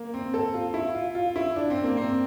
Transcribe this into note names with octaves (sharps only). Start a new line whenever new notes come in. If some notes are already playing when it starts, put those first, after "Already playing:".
Already playing: A#3
C4
A4
F4
E4
F4
F4
E4
D4
C4
A#3
C4